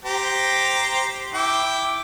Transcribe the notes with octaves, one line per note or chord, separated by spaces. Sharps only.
G4 C5 A#5
E4 G5 D6